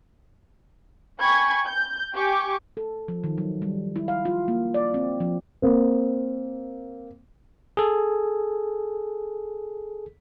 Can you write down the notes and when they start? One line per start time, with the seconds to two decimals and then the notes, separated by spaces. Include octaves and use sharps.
1.21 G5 G#5 B5 C#6 G#6
1.66 G6
2.14 G4 G5 G#5 C#6 D6
2.77 A4
3.08 F3
3.24 D#3
3.38 F#3
3.62 G3
3.96 E4
4.08 F5
4.25 F4
4.48 A#3
4.74 D5
4.94 C4
5.20 F3
5.62 A#3 C4
7.77 G#4 A4